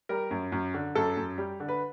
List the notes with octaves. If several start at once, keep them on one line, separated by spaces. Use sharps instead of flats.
G3 A#4
F#2
F#2
D3
F#2 A4
F#2
G3
D3
B4